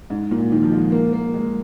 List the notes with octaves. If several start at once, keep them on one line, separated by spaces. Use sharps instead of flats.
G#2
A#2
D#3
F3
G#3
A#3
A#3
G#3